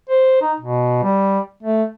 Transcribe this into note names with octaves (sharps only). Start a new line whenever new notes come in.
C5
D#4
B2
G3
A3